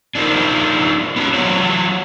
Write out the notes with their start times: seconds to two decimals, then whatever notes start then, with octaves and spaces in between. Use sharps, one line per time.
0.15 D4 D#4 F4 A#4 C5
1.16 B3 C#4 F#4
1.34 F#3 F4 F#4 C5 C#5